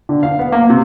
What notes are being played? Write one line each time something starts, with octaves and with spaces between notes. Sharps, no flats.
D3
F5
B3
A#3
C3